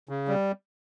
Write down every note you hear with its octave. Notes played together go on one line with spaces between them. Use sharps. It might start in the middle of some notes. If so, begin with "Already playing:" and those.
C#3
G3